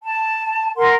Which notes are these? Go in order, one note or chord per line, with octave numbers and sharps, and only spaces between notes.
A5
A#4 F#5 C6